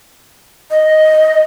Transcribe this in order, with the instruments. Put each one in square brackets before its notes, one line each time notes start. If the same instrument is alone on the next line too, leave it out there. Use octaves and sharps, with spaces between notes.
[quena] D#5